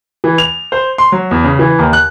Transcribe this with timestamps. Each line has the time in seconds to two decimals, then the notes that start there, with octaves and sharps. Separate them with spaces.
0.24 E3
0.38 F7
0.72 C5
0.98 C6
1.12 F#3
1.31 E2
1.44 C#3
1.59 E3
1.79 D#2
1.93 F#6